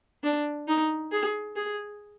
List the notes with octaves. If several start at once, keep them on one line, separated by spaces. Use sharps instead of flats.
D4
D#4
G#4
G#4